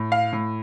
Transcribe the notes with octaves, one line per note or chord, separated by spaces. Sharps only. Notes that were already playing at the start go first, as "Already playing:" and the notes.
Already playing: A2
F5
A2